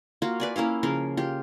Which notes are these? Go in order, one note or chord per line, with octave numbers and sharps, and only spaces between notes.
A#3 F4 F#4
B4 D5 G#5
A#3 C#4 E4 F5
C#3 F3 A#4
F4 G4